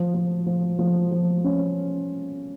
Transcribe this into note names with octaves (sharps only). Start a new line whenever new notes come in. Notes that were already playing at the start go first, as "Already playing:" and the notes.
Already playing: F3
F3
F3
F3
F3
C#4